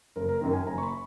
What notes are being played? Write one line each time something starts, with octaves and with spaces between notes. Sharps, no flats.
F#1 A#4
A#4
F#2 D#3 A#4
G#5
F#1 A#5
C#6
B5